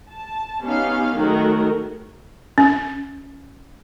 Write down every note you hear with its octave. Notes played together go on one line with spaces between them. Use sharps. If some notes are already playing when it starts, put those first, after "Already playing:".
A5
B3 C#4 D#4 G4 F5
D#3 F#3 A3 F#4 G#4 A#4
C#4